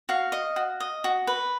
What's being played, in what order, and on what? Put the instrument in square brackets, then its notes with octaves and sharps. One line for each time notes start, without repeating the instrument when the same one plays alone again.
[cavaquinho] F#4 F5
D#5
F#4
D#5
F#4
B4